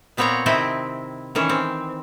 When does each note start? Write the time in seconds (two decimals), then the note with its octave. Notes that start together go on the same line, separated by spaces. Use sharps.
0.17 A#2 B3 C4 C#5 F#5 A#5
0.46 C3 D#3 C4 E4 D#5 G5
1.35 D#3 E3 C#4
1.49 C4